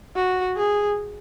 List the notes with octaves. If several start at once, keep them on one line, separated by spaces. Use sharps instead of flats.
F#4
G#4